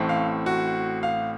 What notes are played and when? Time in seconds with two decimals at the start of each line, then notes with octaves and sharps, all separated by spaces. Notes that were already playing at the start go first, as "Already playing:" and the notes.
Already playing: A1 A2 A3 C4
0.09 F5
0.46 F#4
1.03 F5